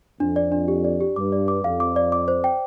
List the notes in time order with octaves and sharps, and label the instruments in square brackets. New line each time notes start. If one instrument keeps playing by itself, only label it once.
[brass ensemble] F2 [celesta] D4
[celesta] D5
D4
G4
D5
G4
[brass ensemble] G2 [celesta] D6
[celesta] D5
D6
[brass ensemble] F2 [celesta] F5
[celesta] D6
D5
D6
C5
G5